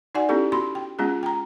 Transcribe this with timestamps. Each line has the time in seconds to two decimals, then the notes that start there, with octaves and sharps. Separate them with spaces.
0.15 D#4 F#4 D5 F#5 G#5
0.29 B3 C#4 E4 G4 A4
0.52 B3 F#4 B5 C6
0.75 G5
0.99 G#3 B3 C#4 F4 G#4
1.23 G5 A#5